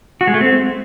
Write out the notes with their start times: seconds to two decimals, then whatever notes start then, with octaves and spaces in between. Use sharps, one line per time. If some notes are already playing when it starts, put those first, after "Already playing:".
0.21 F#4
0.27 G#3
0.34 A3
0.41 C4